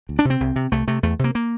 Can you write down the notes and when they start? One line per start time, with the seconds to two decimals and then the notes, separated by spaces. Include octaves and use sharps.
0.09 D2
0.19 D4
0.25 C3
0.30 C4
0.40 C2
0.56 C3
0.72 C2 A3
0.88 C3 A3
1.03 E2 A3
1.19 C3 A#3
1.35 A#3